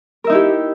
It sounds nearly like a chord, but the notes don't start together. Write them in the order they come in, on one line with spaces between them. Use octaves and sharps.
A#4 E5 D#4 E4 G4